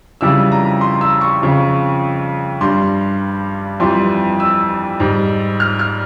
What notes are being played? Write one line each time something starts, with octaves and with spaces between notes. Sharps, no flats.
F2 C#3 E3 G3 E6
A#5
C6
E6
C#6
F2 C#3 F3
G2 G3 C6
F2 E3 G3 C6
E6
G#2 G3
F6
F6